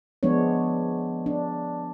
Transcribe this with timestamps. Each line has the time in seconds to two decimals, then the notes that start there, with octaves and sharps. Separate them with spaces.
0.23 F3 G#3 B3 D4 C#5
1.26 D4